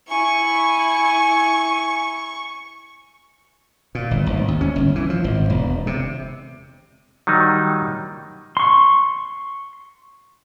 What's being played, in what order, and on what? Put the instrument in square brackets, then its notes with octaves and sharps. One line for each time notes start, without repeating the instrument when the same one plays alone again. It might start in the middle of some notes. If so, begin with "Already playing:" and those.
[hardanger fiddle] E4 [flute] G#5 [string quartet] C#6
[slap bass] A#2
G1
G#1
D#2
C#4
G1
E3
F3
G#1
E1
C3
[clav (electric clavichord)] D#3 F#3 G3 D#4
[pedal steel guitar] C6 C#6